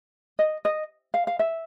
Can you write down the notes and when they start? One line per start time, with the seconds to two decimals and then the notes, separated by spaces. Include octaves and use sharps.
0.39 D#5
0.65 D#5
1.14 F5
1.27 F5
1.39 E5